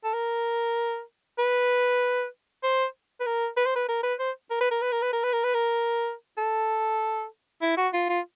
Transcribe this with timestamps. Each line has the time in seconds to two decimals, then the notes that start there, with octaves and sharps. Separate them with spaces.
0.04 A4
0.14 A#4
1.39 B4
2.63 C5
3.20 B4
3.26 A#4
3.57 B4
3.66 C5
3.76 B4
3.89 A#4
4.03 B4
4.20 C5
4.51 A#4
4.61 B4
4.71 A#4
4.82 B4
4.92 A#4
5.02 B4
5.13 A#4
5.24 B4
5.33 A#4
5.44 B4
5.54 A#4
6.38 A4
7.62 E4
7.77 F#4
7.94 F4
8.09 F4